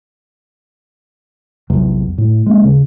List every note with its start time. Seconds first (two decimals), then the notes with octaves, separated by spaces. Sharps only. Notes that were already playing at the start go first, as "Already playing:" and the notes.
1.70 A#1 E2 C3 F#3
2.18 A2
2.46 G#3 A#3 B3 C#4
2.62 D#2 C#3